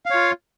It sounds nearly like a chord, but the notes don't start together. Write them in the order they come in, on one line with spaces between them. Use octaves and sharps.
F5 C#5 F4